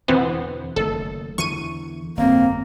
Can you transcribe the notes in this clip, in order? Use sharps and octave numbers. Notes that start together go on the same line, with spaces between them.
E2 B2 D3 E3 B3 C4
F#1 D#3 A3 A4
E2 D3 E3 C#6 D#7
G1 F2 A#3 C4